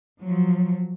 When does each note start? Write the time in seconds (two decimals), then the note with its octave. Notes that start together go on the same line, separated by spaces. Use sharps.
0.20 F3 F#3